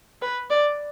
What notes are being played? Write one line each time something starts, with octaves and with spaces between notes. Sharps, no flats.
B4
D5